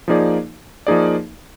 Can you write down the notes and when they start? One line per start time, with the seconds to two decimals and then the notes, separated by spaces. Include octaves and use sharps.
0.08 F3 A#3 D#4 G#4 D5
0.87 F3 A#3 D#4 G#4 D5